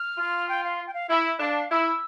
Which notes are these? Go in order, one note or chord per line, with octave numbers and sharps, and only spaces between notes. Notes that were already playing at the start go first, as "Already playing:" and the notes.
Already playing: F6
F4
G5
F5
G5
F5
E4 E5
D4 F5
E4 E6
E6